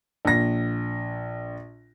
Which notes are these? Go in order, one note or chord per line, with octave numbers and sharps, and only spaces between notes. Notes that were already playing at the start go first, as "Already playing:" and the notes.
A#1 A#6